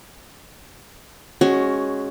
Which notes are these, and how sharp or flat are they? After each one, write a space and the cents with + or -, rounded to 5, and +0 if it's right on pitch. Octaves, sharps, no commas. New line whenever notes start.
G#3 +0 C#4 +0 F#4 +15